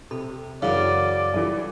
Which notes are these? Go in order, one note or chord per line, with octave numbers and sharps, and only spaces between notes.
C3 A4 B5
F#2 C#3 E3 D5 F5
G2 E3 G3 F4 A4